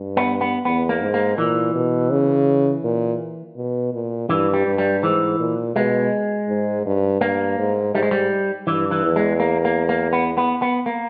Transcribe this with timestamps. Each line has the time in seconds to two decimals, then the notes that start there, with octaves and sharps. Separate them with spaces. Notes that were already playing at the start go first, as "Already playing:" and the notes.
Already playing: G2
0.17 B3
0.41 B3
0.65 E2 B3
0.89 A#3
1.01 G#2
1.14 A#3
1.38 A#2 E3
1.75 B2
2.11 C#3
2.84 A#2
3.56 B2
3.93 A#2
4.29 G2 E3
4.54 G3
4.67 G2
4.78 G3
5.03 G#2 E3
5.39 A#2
5.76 B2 G#3
6.48 G#2
6.86 G2
7.21 G2 A#3
7.58 G#2
7.95 G#2 G3
8.03 G#3
8.11 G3
8.67 G2 E3
8.91 E3
9.04 E2
9.16 G#3
9.40 A#3
9.65 A#3
9.89 A#3
10.13 B3
10.38 B3
10.62 B3
10.86 A#3